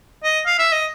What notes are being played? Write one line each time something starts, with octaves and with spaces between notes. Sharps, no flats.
D#5
F5
E5
D#5